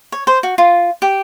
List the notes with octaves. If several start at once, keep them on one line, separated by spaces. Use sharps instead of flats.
C#5
C5
F#4
F4
G4